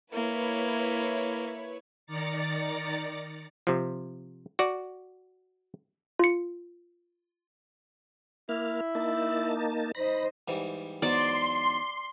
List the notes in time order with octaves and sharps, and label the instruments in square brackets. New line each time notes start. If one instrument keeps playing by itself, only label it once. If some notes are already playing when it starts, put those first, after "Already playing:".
[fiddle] A#3 [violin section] E4 B4 C#5
[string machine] D#3 D5 A#5 A6 C#7
[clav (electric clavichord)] C3 F3
F#4 D5
[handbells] F4 C#7
[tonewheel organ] A#3 F6 [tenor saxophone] E4
[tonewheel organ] A#3 D#4 A5
[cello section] D#4 C5 D#5 [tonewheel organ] B5 A#6
[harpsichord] G#2 E3 G3
[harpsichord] E2 G#2 F#3 [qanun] D5 [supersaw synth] C6